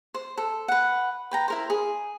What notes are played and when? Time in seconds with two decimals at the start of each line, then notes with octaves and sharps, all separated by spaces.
0.14 C5
0.38 A4
0.68 B4 F#5
1.31 B4 G5 A#5
1.48 E4 A#4 C5
1.70 G#4